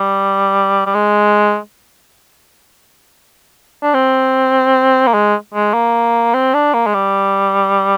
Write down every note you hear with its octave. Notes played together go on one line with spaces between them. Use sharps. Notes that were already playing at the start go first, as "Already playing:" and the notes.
Already playing: G3
G3
G#3
D4
C4
A#3
G#3
G#3
A#3
C4
D4
A#3
G#3
G3